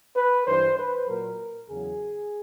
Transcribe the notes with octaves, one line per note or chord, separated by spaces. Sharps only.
B4
G2 E3 G3 C5
B4
A#2 F#3 A#4
E2 C#3 F#3 G#4